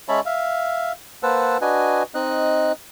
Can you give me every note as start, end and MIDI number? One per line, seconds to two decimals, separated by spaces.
0.09 0.20 56
0.09 0.20 61
0.09 0.20 73
0.09 0.20 76
0.09 0.20 81
0.09 0.20 83
0.26 0.92 76
0.26 0.92 77
1.23 1.58 58
1.23 1.58 71
1.23 1.58 72
1.23 1.58 78
1.23 1.58 81
1.23 1.58 88
1.61 2.03 62
1.61 2.03 66
1.61 2.03 71
1.61 2.03 75
1.61 2.03 80
2.14 2.72 60
2.14 2.72 63
2.14 2.72 75
2.14 2.72 90